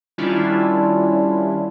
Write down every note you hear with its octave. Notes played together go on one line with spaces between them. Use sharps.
D#3 G3 C#4 D4 E4 F4